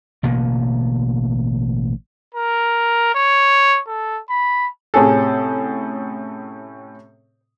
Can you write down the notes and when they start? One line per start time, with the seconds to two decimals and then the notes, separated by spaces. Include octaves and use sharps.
0.23 A1 B2 D3 A#3
2.34 A#4
3.15 C#5
3.87 A4
4.29 B5
4.94 A2 C3 C#4 G#4 A4